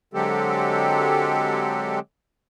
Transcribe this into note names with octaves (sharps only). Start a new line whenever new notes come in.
D3 F#3 G#3 C4 G4 A4